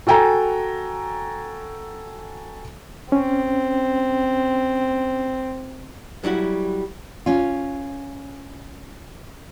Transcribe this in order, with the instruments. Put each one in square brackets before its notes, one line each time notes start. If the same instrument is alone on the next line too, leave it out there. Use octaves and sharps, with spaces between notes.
[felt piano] F#4 A4 G5 G#5 A#5
[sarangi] C4 [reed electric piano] C#4
[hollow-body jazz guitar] F#3 G3 E4 F#4
[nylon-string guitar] C#4 F4